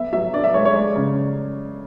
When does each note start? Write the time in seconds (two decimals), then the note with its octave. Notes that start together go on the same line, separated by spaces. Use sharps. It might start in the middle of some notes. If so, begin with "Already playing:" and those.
Already playing: B3 E5
0.13 F#3 E5
0.33 D4 D5
0.44 E5
0.54 G#3 C#5
0.65 C#5
0.75 G#3 D5
0.96 C#3